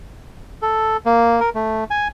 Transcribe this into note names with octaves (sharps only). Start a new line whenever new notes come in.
A4
A#3
A#4
A3
G#5